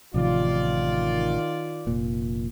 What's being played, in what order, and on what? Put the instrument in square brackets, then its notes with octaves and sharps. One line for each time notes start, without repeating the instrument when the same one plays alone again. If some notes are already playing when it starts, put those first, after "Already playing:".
[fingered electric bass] A1 C3 F3 [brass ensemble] D#3 F4 D5
[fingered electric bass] F1 A#2